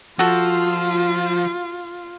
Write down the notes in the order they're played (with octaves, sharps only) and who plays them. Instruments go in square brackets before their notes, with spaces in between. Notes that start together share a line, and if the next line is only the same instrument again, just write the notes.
[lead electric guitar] F3 [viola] F4 [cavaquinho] F#4 A4